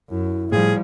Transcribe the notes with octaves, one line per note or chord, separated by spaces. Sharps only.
F#2 E4
A2 F3 G3 G#4